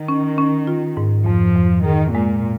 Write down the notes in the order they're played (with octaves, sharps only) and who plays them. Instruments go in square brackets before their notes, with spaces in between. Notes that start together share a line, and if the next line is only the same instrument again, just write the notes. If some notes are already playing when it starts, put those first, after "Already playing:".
Already playing: [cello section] D#3
[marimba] C#4
C#4
F4
G#2
[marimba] F2 [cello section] F3
[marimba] F2
[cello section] D#3 [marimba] G#4
[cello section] A#2 [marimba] G#3